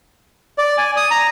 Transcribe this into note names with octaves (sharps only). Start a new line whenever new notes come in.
D5
G#5
D#6
A#5